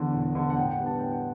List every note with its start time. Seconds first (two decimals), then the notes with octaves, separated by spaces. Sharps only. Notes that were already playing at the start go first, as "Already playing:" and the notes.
Already playing: E2 D3
0.13 E1
0.35 E2 D3
0.50 F#5
0.57 A2 G5
0.72 F#5
0.78 G3 B3 D4
0.86 A5
0.99 A2 G5
1.13 F#5